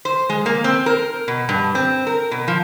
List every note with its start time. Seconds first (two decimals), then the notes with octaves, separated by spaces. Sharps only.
0.05 C5
0.30 G#3
0.46 A#3
0.64 C4
0.86 A#4
1.28 B2
1.49 G2
1.75 C4
2.07 A#4
2.31 B2
2.48 F3